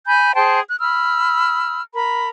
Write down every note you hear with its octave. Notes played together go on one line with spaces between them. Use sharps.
G#5 B5 G6
G#4 C5 G5 A5
F#6
B5 E6 F6
A#4 B5